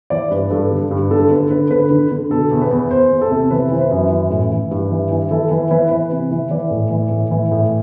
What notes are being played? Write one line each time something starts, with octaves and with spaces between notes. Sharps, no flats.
E3 D5
G2 B4
G2 A4
D3
G2
D3 A4
D3 B4
D3 B4
D3 B4
D3
D3
B2 A4
E2
B4
E2
E2 C5
E2
A4
C3
E3 B4
E3 C5
B4
F#2
E3
A2
E3
G2
E3
E3
E3 A4
E3 B4
E3 B4
E3 B4
C3
E3
E3 D5
A2
E3
A2
E3
A2